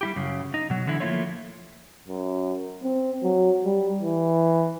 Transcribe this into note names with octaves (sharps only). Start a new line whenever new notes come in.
G3 E4 G4
F#2 C#3
D#4
B2 F#3
D3 E3 E4
F3 A3 A#3 E4 F4 C#5
F#2
C4
F#3
G3
E3